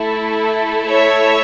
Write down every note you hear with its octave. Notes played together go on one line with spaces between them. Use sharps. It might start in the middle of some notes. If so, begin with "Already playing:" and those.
Already playing: A3 E4 A4
C#5 E5